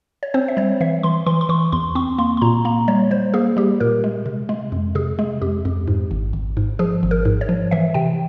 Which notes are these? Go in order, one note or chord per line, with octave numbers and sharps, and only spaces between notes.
C#5
C4 C5
E5
G3 C#5
E3 E5
E3 C6
E3 C6
C6
E3 C#6
E2 C6
C4 C#6
A#3 C6
C6
A#2 A#5
A#3 A#5
G3 C#5
G3 C5
A#3 G#4
G3 G4
A#2 A#4
G#3
C3
G#3
F2
C3 G#4
G#3
F2 G4
F2
G#2
G#1
G#1
G#2
F3 G#4
G#1
A#4
G#2
C#5
F3
E3 E5
C3 G5